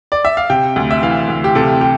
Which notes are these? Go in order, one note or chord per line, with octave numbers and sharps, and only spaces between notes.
D5
E5
F5
C3 G5
D2
E5
E3 F5
D2
G4
C3 A4
G4